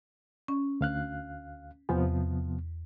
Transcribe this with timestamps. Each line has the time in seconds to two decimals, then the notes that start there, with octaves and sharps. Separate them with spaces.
0.48 C#4
0.81 D2 F5 F#6
1.89 E2 C3 F3 B3